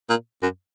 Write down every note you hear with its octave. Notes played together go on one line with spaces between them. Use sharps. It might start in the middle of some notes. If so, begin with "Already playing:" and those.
A#2
F#2